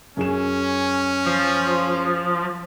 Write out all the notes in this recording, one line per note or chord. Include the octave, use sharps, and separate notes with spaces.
F#2 C#4 G#4 E7
F3